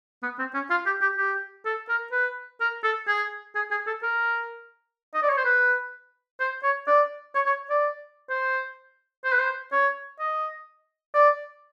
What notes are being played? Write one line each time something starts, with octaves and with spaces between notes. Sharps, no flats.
B3
C4
C#4
F4
G4
G4
G4
A4
A#4
B4
A#4
A4
G#4
G#4
G#4
A4
A#4
D#5
D5
C#5
C5
B4
C5
C#5
D5
C#5
C#5
D5
C5
C5
B4
C5
C#5
D#5
D5